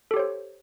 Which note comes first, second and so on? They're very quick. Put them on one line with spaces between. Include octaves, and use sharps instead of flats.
A4 G4 C#5 C5